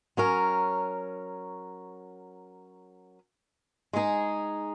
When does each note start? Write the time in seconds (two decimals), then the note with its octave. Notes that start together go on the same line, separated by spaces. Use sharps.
0.17 F#3 C#4 A#4
3.93 G#3 D#4 G#4